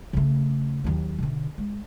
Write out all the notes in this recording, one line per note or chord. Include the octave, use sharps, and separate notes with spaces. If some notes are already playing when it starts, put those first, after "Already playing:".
C#3 A3
D#2 F#3
B2 D3
G#3